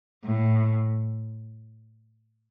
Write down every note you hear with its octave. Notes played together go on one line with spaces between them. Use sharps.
A2